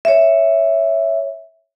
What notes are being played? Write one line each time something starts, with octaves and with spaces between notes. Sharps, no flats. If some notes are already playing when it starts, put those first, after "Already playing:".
C#5 E5